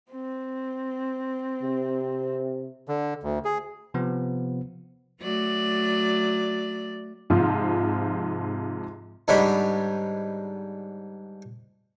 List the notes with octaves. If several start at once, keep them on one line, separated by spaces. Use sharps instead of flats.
C4
C3
D3
D2
G#4
C3 F3 B3
F#3 A3 D5
G#2 C3 F3 F4
G#2 D3 G3 G#3 C#5 B5